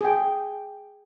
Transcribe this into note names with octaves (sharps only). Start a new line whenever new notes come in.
G#4 G5